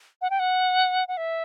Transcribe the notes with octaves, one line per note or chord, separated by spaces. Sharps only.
F#5
G5
F#5
F#5
E5